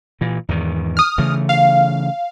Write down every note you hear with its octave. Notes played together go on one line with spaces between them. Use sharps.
A#2 E3
E2 G#2 D#3
D#6 F6
C#3 E3 A3
F5